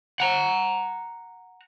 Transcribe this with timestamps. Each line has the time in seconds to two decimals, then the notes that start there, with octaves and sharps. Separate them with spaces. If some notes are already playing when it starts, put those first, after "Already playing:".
0.20 F#5 A#5